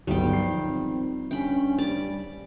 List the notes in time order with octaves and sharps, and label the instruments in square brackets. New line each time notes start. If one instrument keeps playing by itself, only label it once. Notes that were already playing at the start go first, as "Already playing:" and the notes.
[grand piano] G1 F#3 B3 [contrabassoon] D#3 [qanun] G3 G5
[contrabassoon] D#3 [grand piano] F3 C7
[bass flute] C4
[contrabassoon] G2 [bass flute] C#4 [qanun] G5 B5
[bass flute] G3 [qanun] D5